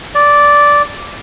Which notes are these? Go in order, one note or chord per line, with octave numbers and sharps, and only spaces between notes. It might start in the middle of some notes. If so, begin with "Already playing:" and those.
D5